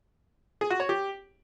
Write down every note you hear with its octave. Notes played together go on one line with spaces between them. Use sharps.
G#4
F#4
C#5
G4